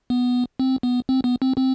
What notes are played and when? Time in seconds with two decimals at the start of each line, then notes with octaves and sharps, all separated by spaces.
0.10 B3
0.60 C4
0.83 B3
1.09 C4
1.24 B3
1.42 C4
1.57 C4